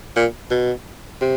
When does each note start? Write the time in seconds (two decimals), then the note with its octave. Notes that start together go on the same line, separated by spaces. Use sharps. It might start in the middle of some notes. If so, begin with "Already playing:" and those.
0.16 A#2
0.51 B2
1.21 C3